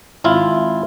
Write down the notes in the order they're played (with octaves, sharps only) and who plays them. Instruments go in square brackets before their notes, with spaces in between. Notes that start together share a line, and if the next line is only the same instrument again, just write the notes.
[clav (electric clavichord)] G#1 E4 F4